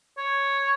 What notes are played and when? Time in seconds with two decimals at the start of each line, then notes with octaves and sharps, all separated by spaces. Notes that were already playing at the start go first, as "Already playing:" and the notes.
0.18 C#5